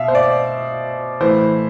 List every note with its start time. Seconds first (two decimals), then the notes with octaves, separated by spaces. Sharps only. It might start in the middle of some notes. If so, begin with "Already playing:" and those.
Already playing: B2 E5 F5
0.08 C5
0.15 D5
1.21 A2 E3 C5